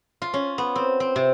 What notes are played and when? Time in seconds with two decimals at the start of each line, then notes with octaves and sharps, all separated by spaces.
0.22 F4
0.34 C#4
0.58 B3
0.76 C4
1.00 C4
1.16 C3